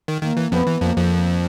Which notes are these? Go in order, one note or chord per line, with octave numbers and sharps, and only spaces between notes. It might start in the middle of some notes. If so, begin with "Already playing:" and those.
D#3
D#3 A#3
E3
F2 F3 B3
E3
F2 F3 A#3
F2 F3
A#3